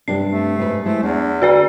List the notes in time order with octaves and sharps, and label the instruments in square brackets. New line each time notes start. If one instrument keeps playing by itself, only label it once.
[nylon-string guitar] G2 C3 D4 [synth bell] C7
[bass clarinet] A3
[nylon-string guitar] G#2 B4
[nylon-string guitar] G#3 E4 C5 [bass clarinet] A3
[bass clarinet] E2 [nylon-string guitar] D4
[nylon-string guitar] D3 [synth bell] F#4 B4 D5